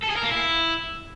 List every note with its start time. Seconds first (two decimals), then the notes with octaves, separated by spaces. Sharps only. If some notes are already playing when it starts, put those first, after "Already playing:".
0.04 A4
0.10 G#4
0.17 A#4
0.24 A#3
0.31 E4